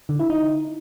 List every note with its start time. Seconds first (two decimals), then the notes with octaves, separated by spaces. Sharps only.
0.09 D3
0.19 E4
0.30 D#4